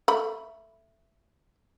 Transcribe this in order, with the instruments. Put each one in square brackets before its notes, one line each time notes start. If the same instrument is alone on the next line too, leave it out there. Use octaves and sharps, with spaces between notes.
[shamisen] A3 B5